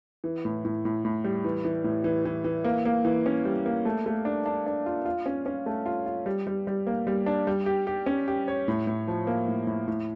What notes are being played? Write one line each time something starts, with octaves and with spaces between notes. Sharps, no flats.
E3
A2
A2
A2
A2
G3
E3
E3
A2
E3
E3
E3
A#3
A#3
E3
C#4
G3
A#3
A3
A3
D4
D4
D4
F4
F4
C#4
C#4
A3
F4
F4
G3
G3
G3
A#3
G3
D4
G3
G4
G4
C#4
G4
C#5
A2
A2
F3
A#3
A2
A2
A2